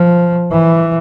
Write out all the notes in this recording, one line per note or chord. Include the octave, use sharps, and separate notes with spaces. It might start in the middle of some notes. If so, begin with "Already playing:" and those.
Already playing: F3
E3